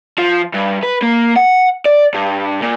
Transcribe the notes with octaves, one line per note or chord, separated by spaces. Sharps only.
F3
G2
B4
A#3
F#5
D5
G2
A#2